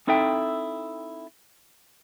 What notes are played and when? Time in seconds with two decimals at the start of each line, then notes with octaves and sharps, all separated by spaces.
0.07 C4 D#4 E4 A4 E5 G5